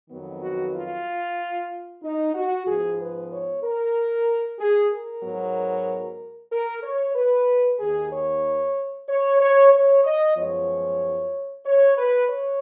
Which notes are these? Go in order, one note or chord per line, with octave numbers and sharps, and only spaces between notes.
F2 D#3 F#3 B3
F#4
F4
D#4
F#4
G#2 F3 B3 G#4
B4
C#5
A#4
G#4
A#4
G#2 F#3 B3
A#4
C#5
B4
D#2 D#3 A#3 G#4
C#5
C#5
C#5
C#5
D#5
F#2 F3 G#3 B3 C#5
C#5
B4
C#5